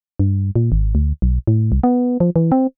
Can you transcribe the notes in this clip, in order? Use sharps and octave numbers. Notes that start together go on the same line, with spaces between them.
G2
A#2
G#1
D2
B1
A2
C2
B3
F3
E3
C4